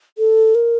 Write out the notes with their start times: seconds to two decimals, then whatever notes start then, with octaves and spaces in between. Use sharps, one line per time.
0.18 A4
0.55 A#4